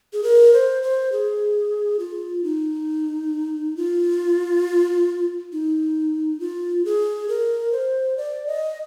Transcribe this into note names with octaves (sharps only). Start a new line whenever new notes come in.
G#4
A#4
C5
C5
G#4
F4
D#4
F4
D#4
F4
G#4
A#4
C5
D5
D#5